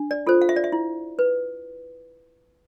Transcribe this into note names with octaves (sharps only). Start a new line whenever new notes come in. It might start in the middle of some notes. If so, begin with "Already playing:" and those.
Already playing: D4
D5
F4 A4 C5
F5
E5
D5
E5
E4
B4